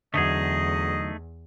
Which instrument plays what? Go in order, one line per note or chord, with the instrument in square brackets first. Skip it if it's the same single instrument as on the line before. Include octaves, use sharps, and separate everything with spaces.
[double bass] E2 [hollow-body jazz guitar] D3 F#3 [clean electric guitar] A3 D#4 G#4 [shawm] D#5